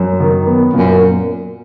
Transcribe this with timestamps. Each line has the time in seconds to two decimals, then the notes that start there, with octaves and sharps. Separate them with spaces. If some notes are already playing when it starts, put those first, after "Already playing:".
Already playing: F#2
0.20 D#3
0.47 B3
0.73 F#2 A#2